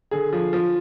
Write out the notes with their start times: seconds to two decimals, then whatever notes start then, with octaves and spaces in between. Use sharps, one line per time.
0.11 D3 G#4
0.32 F3
0.53 F3